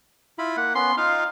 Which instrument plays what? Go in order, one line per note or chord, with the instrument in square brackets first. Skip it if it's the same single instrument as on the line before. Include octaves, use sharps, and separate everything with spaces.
[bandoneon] E4 F4 B5
[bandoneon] A#3 [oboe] F#5
[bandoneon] B3 C#4 [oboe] C6
[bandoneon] D#4 F4 [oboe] F5